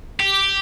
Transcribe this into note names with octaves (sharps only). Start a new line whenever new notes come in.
G4